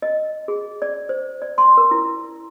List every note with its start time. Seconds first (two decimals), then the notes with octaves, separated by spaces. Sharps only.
0.02 D#5
0.48 G#4
0.82 D5
1.09 C5
1.42 D5
1.58 C6
1.77 A#4
1.91 E4